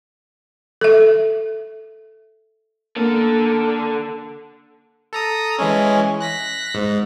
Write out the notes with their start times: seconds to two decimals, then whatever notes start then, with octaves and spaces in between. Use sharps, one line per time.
0.81 A4 E5
2.96 D3 A#3 A4
5.13 A4 A#5 D#6
5.59 E3 G#3 C#4
6.21 F#6 A#6 B6
6.75 G#2